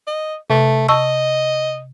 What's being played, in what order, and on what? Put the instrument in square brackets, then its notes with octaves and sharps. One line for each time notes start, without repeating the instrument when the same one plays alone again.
[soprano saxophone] D#5
[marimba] C3 [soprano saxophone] A3
[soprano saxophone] D#5 [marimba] A5 C#6 E6